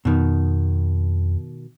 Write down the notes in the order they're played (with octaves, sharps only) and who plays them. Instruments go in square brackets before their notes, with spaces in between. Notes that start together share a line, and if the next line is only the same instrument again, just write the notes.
[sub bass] F2 [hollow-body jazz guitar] B2 D#3